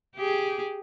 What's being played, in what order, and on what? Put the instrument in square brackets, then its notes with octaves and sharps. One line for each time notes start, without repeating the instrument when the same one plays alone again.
[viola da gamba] G4 G#4